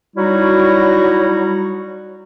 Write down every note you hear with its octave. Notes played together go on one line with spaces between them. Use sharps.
F#3 G3 D#4 E4 F#4